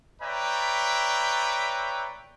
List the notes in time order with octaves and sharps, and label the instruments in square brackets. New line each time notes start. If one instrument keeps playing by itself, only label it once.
[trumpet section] B4 C#5 D5 E5 G5 A#5